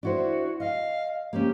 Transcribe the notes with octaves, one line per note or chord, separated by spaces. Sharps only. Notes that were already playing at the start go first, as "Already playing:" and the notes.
D4 E4 F#4 C5
D#5 F5
A#3 C4 C#4 G4